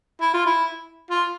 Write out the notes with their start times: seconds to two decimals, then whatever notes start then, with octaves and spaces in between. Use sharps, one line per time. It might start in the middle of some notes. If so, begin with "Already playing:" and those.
0.21 E4
0.34 F4
0.46 E4
1.10 F4